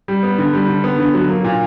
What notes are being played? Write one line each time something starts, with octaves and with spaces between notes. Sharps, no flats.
G3
B3
D3
G3
D3
B3
D3
F#3
A#3
A#2